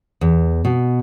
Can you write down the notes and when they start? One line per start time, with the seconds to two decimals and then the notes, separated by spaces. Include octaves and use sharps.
0.21 E2
0.65 B2